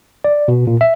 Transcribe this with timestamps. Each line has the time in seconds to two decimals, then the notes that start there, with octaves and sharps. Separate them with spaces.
0.24 D5
0.48 B2
0.67 A#2
0.81 E5